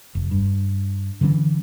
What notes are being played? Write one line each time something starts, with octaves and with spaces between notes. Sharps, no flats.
F1
G2
D3 E3 F#3 C#4